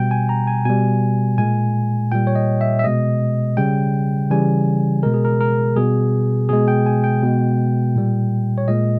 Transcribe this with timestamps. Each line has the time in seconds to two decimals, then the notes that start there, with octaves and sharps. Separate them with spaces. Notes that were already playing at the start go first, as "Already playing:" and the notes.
Already playing: B2 G3 G5
0.11 G#5
0.29 A#5
0.47 G#5
0.65 B2 G3 G#5
1.38 A#2 G#3 G#5
2.12 A#2 G3 G5
2.27 C#5
2.35 D#5
2.61 E5
2.79 E5
2.84 B2 G#3 D#5
3.57 C#3 G3 G5
4.30 C#3 E3 G3 G#5
5.03 B2 G#3 A#4
5.14 G#4
5.25 A#4
5.41 A#4
5.76 B2 G3 G#4
6.49 B2 G#3 G#4
6.68 G5
6.86 G#5
7.04 G5
7.22 B2 G#3
7.96 A#2 G3
8.58 C#5
8.68 A#2 G#3 D#5